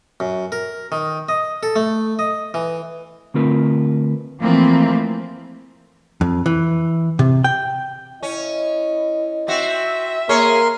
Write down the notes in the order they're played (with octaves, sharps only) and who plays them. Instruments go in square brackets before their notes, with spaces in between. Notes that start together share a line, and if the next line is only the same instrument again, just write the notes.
[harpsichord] F#2
A#4
D#3
D#5
A4
A3
D#5
E3
[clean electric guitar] D3 A3 C4 F4 A#4 B4
[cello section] E3 F3 A3 A#3 C4
[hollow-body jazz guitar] F2
E3
C3
G5
[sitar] C#4 [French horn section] E4 D#5
[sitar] C4 F#4 [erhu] E5
[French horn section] A#3 [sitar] G#4 C#5 [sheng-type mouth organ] A#4 C6